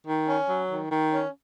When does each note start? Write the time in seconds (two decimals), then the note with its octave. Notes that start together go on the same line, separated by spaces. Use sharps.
0.07 D#3
0.29 C#4
0.48 F#3
0.70 D#3
0.90 D#3
1.11 C#4